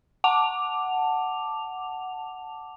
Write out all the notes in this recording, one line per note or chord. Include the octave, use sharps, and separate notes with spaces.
F#5 A5 D6 F7